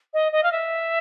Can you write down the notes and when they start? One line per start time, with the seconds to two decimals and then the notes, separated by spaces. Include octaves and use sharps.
0.13 D#5
0.32 D#5
0.43 F5
0.51 E5